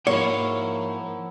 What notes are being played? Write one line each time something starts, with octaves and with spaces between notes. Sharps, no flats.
G#2 F3 F#3 A#3 E4 C#5 C6